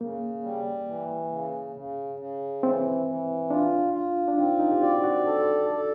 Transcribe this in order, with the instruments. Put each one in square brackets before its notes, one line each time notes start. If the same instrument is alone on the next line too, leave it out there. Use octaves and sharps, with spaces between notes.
[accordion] C#3 [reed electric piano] A#3
[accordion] G3
E3
C#3
C#3
C#3
[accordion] E3 [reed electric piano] C4
[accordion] E3
[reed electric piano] D4 [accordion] F4
[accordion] F4
[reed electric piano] D4
[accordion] C4 [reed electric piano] D#4
[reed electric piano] D#4
G4
[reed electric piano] F#4 [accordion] D5
[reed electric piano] F#4
[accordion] A4
A4